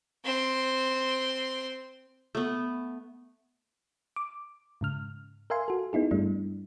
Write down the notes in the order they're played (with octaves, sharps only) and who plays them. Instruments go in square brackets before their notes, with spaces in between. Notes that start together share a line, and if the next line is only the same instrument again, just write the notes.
[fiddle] C4 C6
[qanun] A3 B3
[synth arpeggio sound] D6
G#2 C#3 F6
A#4 E5 F5 G#5 C6
F#4 A4
B3 D#4 E4 G#4
G2 G3 A3 D4 E4